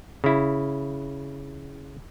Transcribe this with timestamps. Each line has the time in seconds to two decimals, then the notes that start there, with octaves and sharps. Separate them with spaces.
0.24 C#3 E4